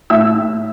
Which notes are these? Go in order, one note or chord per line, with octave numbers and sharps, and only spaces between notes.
A2 E5 E6